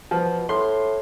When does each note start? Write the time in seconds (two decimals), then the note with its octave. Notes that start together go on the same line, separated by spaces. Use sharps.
0.11 B2 F3
0.49 A2 C6